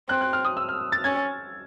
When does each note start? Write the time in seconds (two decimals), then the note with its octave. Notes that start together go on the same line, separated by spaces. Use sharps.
0.09 C4 F#6
0.21 F#6
0.33 F6
0.45 D#6
0.57 E6
0.69 F6
0.92 A6
1.04 C#4 G#6